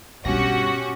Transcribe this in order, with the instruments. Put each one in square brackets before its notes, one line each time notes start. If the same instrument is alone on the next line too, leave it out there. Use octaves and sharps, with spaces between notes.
[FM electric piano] G2 A#6 [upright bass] B2 [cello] C#4 G4 [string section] F#4